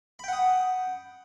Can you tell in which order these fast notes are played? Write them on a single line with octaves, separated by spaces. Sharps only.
B5 G5 F#5 D#6